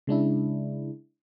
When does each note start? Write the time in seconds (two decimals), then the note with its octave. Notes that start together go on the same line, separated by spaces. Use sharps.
0.07 C#3 G#3 D4 E4